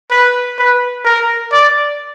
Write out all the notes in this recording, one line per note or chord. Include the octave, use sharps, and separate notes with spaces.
B4
B4
A#4
D5